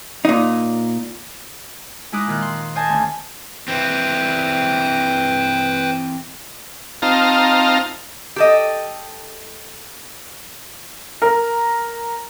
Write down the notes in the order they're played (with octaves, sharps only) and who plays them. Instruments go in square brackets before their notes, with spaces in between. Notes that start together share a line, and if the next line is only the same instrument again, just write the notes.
[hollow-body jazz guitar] A#2 D#4
[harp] G#3 D#4 E4 D6 D#6 F#6
A#2 D#3 F#6
C6
C5 D#5 G#5 A5
D2 C#4
[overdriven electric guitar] E3 C4 [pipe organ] B4 C5 G5
[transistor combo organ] C4 D#4 F4 F5 A5 A#5
[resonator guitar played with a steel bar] G4 A4 D#5
[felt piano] A#4